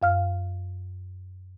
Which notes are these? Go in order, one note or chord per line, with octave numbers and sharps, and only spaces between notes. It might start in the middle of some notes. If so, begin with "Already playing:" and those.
F#2 F5 F6